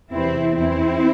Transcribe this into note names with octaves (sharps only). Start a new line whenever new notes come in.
E2 C3 E3 C4 E4
E2 E3 C4 E4